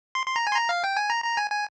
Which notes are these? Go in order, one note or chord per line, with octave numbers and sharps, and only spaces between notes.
C6
C6
A#5
G#5
C6
A#5
F5
G5
G#5
A#5
A#5
G#5
G#5